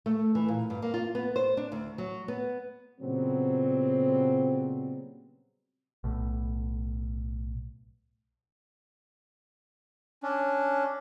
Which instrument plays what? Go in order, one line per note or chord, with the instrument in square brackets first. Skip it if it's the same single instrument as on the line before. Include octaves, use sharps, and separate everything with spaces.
[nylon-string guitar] A3
E3
A#2
G2
A#3
F4
B3
C5
D4
D2
F#3
B3
[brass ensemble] A#2 C#3 F#3 G3 B3 C4
[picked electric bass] B1 A2
[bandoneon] C#4 D4